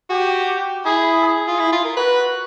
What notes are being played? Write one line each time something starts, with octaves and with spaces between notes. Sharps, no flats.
F#4 G4
E4 G#4
G#4
F4
E4
F4
A#4
F#4 B4